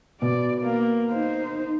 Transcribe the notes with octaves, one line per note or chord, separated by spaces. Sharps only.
B2 D5
A#3
D#4 C5